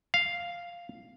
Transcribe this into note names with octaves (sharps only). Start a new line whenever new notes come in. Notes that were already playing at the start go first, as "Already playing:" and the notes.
F5